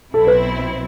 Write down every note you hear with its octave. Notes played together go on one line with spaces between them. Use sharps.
B1 B2 F#3 C4 E4 A4
B4